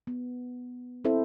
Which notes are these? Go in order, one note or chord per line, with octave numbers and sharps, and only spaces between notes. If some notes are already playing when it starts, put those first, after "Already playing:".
B3
C4 E4 A4 C5 E5